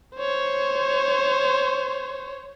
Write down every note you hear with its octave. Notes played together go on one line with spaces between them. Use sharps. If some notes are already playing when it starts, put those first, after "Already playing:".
C5 C#5